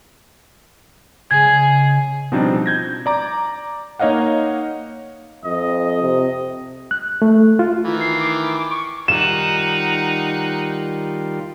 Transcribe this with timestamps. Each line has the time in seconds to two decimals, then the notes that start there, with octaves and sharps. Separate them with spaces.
1.31 C#3 G#3 G#4 G#6
2.32 B2 F3 G3 C4 D4 D#4
2.66 G6 G#6 A#6
3.06 D5 A#5 D6
3.99 A#3 D#4 C#5 D#5 F5 F#5
5.45 F2 D#5
6.02 C3
6.91 F#6
7.22 A3
7.59 F4
7.85 D#3 E3
8.01 C7
8.20 D6
8.71 C#6
9.08 D#3 G3 D#4 F4 F#5 E7